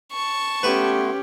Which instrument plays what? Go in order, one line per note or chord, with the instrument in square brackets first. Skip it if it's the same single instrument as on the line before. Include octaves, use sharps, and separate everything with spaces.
[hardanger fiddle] A5 C#6
[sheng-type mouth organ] A3 B3 C6 [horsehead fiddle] C#4 G4 [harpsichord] B4